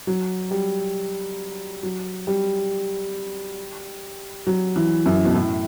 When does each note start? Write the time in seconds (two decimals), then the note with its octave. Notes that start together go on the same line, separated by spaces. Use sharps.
0.07 F#3
0.51 G3
1.83 F#3
2.27 G3
4.47 F#3
4.76 E3
5.06 F#2
5.25 B2
5.35 A2